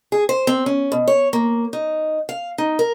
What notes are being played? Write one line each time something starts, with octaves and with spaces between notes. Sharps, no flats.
G#4
C5
C4
C#4
B2
C#5
A#3
D#4
F5
D#4
A#4